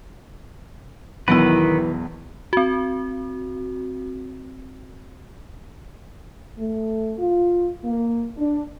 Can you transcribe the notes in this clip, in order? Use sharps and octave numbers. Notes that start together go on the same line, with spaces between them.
B1 E2 D#3 E3 F#3 B3 E4 B4
C4 F#4
A3
F4
A#3
D4